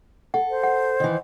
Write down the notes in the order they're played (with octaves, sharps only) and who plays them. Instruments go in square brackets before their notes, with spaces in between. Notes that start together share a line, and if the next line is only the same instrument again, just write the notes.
[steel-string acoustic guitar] A4 [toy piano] F#5
[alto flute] C5
[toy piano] F#5
[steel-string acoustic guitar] D#3 E3